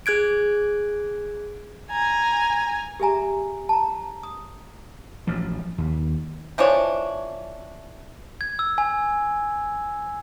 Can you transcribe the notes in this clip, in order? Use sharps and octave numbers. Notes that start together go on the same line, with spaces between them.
G#4 F#6 G#6 D7
G#5 A#5
G4 G#4 E5 G#5 A#5
A5 A#5
D#6
A1 F3 F#3
D#2
E3 F3 D4 C#5
G#6
E6
G#5